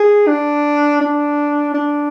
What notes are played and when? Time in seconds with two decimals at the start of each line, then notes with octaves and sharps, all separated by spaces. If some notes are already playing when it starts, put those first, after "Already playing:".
Already playing: G#4
0.27 D4
1.01 D4
1.74 D4